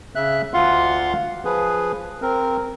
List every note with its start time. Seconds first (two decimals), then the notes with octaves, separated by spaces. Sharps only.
0.15 C#3 E5 F#6
0.54 D2 F4 F5 F#5 C6
1.45 F3 G#4 B4
2.22 C4 A#4